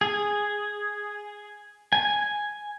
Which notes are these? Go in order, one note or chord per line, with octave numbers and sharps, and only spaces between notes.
G#4
G#5